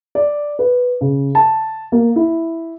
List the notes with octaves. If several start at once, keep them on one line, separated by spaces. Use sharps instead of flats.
D5
B4
C#3
A5
A#3
E4